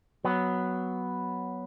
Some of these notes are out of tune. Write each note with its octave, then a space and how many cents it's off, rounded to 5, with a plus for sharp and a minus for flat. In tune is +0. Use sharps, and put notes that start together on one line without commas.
F#3 +5 B3 +0